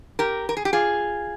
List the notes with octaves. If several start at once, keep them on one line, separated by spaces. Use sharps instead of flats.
G4 A#4
A#4
G#4
G4
F4 G#4